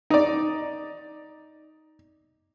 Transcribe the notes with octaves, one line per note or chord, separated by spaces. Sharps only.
D#4 D5